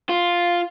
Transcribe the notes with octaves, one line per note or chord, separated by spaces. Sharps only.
F4